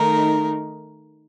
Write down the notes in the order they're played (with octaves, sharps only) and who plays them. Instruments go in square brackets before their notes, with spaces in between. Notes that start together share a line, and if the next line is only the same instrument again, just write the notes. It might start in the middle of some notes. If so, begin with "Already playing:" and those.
Already playing: [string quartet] D#3 A3 D#4 A#4